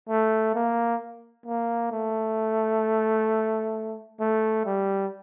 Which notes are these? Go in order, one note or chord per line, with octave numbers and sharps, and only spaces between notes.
A3
A#3
A#3
A3
A3
G3